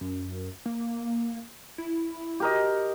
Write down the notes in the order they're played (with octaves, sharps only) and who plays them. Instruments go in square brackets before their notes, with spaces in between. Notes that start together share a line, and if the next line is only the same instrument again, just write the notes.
[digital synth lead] F#2
A#3
E4
[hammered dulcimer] G4 A#4 D#5